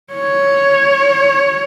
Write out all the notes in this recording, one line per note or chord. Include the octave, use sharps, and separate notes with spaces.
C#5